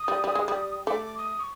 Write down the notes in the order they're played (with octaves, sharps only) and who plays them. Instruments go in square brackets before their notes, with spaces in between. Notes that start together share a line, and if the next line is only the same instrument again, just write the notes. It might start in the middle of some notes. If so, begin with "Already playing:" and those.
Already playing: [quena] D#6
[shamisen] G3
G3
G#3
G3
[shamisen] A3 [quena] D6
[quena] D#6
C#6